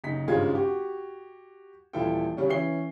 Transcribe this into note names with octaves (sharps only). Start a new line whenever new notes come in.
F#1 D#4 B6
G#1 G2 C#3 G#3 F4 G#6
F#4 G4
D#1 E3 E4 F4 A4 G5
C#3 F#3 G3 C#4
E3 C#4 E5 C7 G7